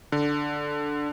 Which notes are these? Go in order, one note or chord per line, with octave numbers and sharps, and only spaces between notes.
D3